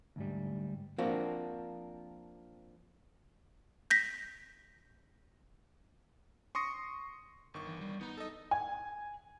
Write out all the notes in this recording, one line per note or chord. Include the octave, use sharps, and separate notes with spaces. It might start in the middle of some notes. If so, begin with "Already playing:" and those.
D2 G#2 G3
F3 A#3 C4 D4 F#4
G6 A#6 B6
C6 C#6 D#6 A#6 C#7
G1 D#3 C#6
E3
G3
B3 D#4 A#5
A4 D#5
G#5